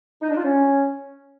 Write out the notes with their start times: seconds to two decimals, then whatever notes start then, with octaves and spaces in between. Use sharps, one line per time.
0.22 D#4
0.29 D4
0.37 F4
0.45 C#4